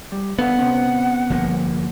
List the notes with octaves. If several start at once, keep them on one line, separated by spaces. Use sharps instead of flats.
G3
D3 B3 A4 F5 F#5
C3 C4 C#4
G1 F3 A#3